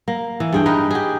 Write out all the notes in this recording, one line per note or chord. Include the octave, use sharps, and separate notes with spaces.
A#3
E3
G2 G#4 G5
D#4 A#4 B4
G4 G#4